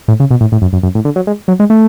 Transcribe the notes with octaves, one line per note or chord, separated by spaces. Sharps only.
A2
C#3
B2
A2
A2
F#2
F#2
F#2
A2
D3
F#3
G#3
F#3
G#3
A3